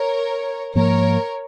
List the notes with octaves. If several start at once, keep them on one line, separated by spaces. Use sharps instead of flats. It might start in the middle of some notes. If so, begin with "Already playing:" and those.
Already playing: A#4 C#5
G#2 F3 A#3 A#4 C#5